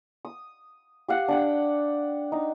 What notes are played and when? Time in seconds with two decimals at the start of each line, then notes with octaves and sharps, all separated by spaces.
0.25 D#6
1.08 G4 F5 F#5
1.28 D4 F#5 G5
2.32 D#4